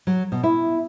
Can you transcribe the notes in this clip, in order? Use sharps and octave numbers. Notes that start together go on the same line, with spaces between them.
F#3
B2
E4